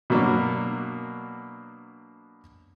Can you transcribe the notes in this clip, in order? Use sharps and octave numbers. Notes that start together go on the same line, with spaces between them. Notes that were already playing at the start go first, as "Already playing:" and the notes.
B2 F#3 A#3 D4